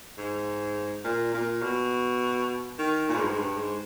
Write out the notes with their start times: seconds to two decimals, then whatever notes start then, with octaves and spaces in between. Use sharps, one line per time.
0.18 G#2
1.04 A#2
1.34 A#2
1.62 B2
2.79 D#3
3.09 A#2
3.15 G#2
3.23 G2
3.30 G#2
3.38 G2
3.57 G#2